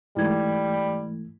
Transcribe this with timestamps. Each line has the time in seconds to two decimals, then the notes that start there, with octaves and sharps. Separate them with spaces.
0.17 G#2 E3 G3 A3 E4 G#6